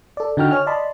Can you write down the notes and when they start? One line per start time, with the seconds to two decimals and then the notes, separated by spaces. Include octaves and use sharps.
0.17 A4 D5
0.37 D3 D#4 F#4 G5 F6
0.51 C#5 G#5 F6
0.66 D5 D#5 A5 B5 C6